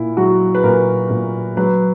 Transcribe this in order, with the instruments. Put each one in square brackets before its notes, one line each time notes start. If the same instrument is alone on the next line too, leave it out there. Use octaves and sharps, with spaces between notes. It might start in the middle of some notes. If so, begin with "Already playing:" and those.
Already playing: [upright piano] A#2 E4
F#3 F#4
B4
A#2 A#4
A#2
F#3 B4